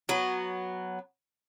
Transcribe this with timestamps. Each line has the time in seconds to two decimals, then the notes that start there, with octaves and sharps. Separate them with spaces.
0.09 F#3 B3